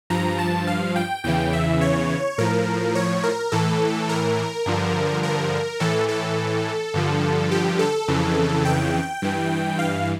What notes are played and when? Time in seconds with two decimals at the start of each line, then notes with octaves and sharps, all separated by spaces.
0.10 G2 F3 A#5
0.39 A5
0.67 F5
0.96 G5
1.24 E2 C#3 E3 G5
1.53 E5
1.81 C#5
2.38 A2 F3 A#4
2.95 C#5
3.24 A#4
3.52 A2 E3 A4
4.09 A#4
4.66 G2 D3 F3
5.23 A#4
5.80 A2 E3 A4
6.08 A4
6.94 G2 D3 F3
7.51 G4
7.79 A4
8.08 F2 C#3 E3
8.65 G5
9.22 G2 E3
9.79 F5